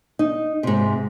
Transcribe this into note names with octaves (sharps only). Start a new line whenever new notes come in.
D#4
G#2 C3